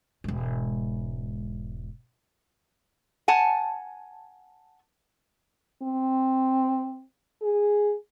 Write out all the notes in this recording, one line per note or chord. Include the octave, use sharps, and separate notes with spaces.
E1 G#2
F#5 G#5 A5
C4
G#4